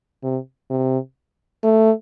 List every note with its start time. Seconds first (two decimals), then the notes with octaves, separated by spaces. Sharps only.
0.23 C3
0.70 C3
1.63 A3